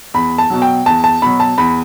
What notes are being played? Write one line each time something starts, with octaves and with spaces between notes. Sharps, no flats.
E2 B5
A5
B2 F#3
G5
E2 A5
A5
B2 F#3 B5
A5
E2 B5